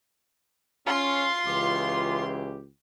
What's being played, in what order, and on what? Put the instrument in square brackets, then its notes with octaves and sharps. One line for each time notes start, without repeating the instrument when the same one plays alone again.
[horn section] C#4 [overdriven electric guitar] F4 [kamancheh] C6
[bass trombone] C#2 [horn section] C#3 E3 G4